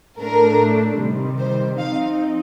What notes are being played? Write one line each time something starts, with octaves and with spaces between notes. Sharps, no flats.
A2 A3 D4 A#4
C3 D#3 G3
C5
F3 C4 D#4 F5